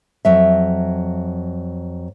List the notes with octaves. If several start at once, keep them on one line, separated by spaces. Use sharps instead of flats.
F2 F#3 E5